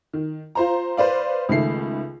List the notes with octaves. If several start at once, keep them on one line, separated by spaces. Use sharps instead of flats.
D#3
F4 C5 A#5
B4 C5 D5 F5
C#2 D#3 A3 C7